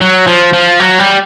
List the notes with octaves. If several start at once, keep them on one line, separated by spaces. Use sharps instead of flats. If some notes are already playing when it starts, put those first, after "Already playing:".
F#3
F3
F3
F#3
G3